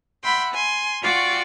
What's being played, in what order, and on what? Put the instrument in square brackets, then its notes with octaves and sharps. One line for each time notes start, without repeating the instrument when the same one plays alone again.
[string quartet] E5 F#5 G5 B5 C6
G#5 C6
F4 F#4 D5 G5 C#6